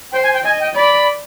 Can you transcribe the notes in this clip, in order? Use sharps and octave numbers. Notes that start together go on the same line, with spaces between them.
C5 G5
G#5
G5
D#5 G#5
G5
D5 B5